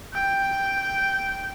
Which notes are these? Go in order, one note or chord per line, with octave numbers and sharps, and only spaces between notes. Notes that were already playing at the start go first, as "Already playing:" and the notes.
G5